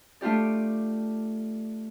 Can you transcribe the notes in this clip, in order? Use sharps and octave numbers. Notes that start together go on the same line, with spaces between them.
A3 D4 F4 G4 D5